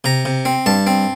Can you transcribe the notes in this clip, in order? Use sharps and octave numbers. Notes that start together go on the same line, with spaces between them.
C3 A#5
C3
C4
G2 A5
C4